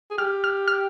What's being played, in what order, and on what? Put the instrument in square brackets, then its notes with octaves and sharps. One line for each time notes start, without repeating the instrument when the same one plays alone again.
[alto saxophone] G#4
[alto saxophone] G4 [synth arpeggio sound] F6
[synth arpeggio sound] F6
F6